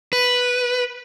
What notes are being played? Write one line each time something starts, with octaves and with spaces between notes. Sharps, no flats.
B4